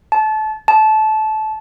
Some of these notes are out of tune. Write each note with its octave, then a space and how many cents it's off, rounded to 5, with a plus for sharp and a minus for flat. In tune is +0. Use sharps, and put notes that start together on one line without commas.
A5 -25
A5 -20